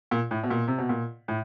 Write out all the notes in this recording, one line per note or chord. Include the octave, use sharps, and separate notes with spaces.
A#2
A2
B2
A#2
C3
B2
A#2
A2